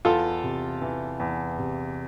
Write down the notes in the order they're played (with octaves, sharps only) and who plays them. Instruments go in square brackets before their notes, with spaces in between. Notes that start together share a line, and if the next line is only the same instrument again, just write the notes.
[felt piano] E2 [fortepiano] F4 A4
[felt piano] C3
E3
E2
C3